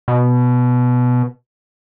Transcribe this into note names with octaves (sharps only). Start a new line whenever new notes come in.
B2